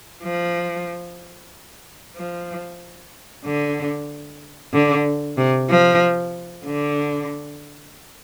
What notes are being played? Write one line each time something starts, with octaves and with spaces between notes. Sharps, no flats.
F3
F3
D3
D3
C3
F3
D3